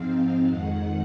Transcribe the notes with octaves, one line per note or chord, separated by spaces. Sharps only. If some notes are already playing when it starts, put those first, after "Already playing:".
Already playing: G#2 F3 C4 F5
F2 D#3 G#3 F#5